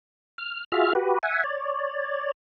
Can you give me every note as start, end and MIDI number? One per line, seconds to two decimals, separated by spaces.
0.38 0.64 89
0.72 0.93 65
0.72 0.93 66
0.72 0.93 68
0.72 0.93 76
0.72 0.93 89
0.95 1.18 66
0.95 1.18 67
0.95 1.18 71
1.23 1.43 76
1.23 1.43 78
1.23 1.43 80
1.44 2.32 73
1.44 2.32 74